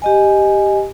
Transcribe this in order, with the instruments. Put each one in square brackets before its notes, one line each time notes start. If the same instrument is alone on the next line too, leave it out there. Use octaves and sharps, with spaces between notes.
[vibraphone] G4 D#5 G#5